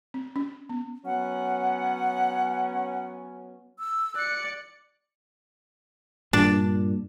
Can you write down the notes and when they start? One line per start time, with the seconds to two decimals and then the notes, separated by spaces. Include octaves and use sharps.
0.14 C4
0.36 C#4
0.69 B3
1.06 F#3 B3 C#4 F#5
3.79 E6
4.15 D5 F#6 C#7
6.33 G2 A#2 D4